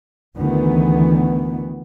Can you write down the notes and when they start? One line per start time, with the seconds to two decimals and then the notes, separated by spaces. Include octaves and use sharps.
0.37 D2 D#3 E3 B3